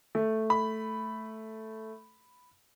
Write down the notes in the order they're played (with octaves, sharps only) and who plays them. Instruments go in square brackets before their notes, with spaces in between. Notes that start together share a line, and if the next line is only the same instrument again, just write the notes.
[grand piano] A3
[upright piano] B5